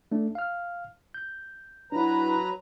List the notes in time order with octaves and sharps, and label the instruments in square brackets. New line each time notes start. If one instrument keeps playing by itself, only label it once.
[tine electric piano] A3 D4
F5 F6
G6
[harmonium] F#3 B4 A#5 [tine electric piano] D4 E4